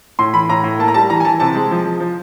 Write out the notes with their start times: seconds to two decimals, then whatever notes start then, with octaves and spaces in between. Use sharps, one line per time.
0.19 A2 C6
0.33 E3 B5
0.49 A2 A#5
0.64 A2
0.79 A#3 A5
0.88 A#5
0.94 G3 A5
1.10 E3 A#5
1.20 G#5
1.25 E3 A5
1.40 C3 A5
1.55 G#3
1.71 F3
1.85 F3
2.00 F3